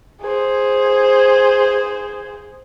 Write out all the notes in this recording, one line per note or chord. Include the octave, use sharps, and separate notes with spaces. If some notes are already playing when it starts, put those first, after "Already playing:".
G#4 C5